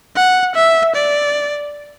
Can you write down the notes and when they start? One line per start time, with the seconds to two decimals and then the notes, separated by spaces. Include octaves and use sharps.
0.16 F#5
0.55 E5
0.95 D5